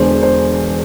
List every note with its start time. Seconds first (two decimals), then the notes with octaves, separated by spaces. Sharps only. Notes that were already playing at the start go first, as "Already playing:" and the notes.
Already playing: E1 E2 D3 C5
0.23 C5